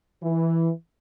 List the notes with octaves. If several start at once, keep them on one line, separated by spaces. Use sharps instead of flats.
E3